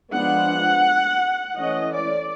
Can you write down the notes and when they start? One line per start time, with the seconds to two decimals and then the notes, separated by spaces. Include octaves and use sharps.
0.13 F3 G#3 B3 D4 F#5
1.57 E3 A3 C#4 D#5
1.94 D5